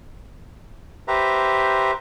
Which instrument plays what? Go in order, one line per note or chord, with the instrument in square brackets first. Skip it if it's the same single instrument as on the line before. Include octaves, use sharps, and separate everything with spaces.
[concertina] G4 B4 C5 E5 A#5